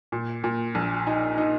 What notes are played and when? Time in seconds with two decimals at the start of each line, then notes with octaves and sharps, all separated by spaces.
0.12 A#2
0.44 A#2
0.75 A#1
1.07 D#4
1.38 D#4